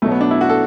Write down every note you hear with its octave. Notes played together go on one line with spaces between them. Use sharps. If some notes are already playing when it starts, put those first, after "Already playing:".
B1 B2 F#3 A3
B3
D4
E4
F#4
A4